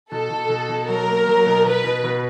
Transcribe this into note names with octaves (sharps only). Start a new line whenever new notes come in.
B2 A4
B2
B2
B2
F#3 A#4
A#3
F#3
B2
B2 B4
B2
B2